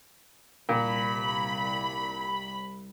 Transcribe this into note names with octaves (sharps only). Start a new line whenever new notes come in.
C2 A#2 B5